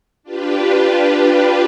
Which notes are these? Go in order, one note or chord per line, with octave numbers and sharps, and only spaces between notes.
D4 F4 G4 B4